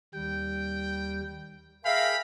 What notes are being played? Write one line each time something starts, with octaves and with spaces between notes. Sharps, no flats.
D#2 G3 G5
G#4 A#4 E5 F5 G5 B5 F6